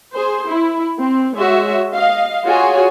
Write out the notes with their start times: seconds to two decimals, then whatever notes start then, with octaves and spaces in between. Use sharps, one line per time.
0.12 G#4 C5
0.48 E4
1.01 C4
1.37 G#3 F#4 C#5 E5
1.94 D#5 F5
2.45 F4 F#4 G#4 C#5 G#5